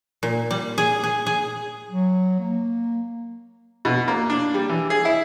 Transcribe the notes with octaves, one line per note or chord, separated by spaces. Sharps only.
A#2
G3
G#4
G#4
G#4
F#3
A#3
B2
A#3
D4
G3
E3
G#4
E4